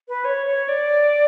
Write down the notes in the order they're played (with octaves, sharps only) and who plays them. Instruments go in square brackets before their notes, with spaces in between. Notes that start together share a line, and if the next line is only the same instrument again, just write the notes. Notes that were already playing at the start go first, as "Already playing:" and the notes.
[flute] B4
C#5
C#5
D5